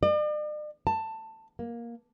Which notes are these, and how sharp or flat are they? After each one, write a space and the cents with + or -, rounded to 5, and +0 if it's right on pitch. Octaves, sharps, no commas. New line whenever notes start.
D5 +45
A5 +15
A#3 +10